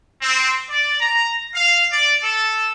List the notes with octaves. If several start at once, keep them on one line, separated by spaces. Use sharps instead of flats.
C4
D5
A#5
F5
D5
A4